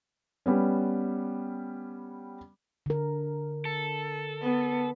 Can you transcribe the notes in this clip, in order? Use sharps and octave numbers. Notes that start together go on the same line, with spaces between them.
G3 B3 C#4
D3 A#4
A4
B3